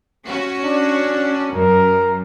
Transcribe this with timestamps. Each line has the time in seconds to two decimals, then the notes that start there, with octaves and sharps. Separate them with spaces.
0.25 C#4 F#4
0.64 D4
1.51 F#2 A#4